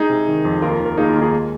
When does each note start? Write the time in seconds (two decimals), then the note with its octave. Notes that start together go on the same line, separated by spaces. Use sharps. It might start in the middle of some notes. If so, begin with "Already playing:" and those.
Already playing: G#3 D#4 G#4
0.10 C3
0.28 D#3
0.45 F2
0.62 D#2 F4 A#4
0.80 D#3
0.86 A#4
0.98 A#3 D#4 G#4
1.09 F4
1.15 D#2
1.21 D#4 G#4
1.33 G#3